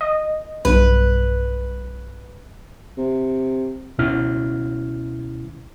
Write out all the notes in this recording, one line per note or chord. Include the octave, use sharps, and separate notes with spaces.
D#5
B1 G2 B4
C3
C#2 B2 C#4 E4 F6